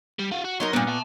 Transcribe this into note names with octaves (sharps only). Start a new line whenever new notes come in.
G3
F4 F#4
F#4
F#3 D#4 A#4 C6
G2 A#2 B3
E5 A5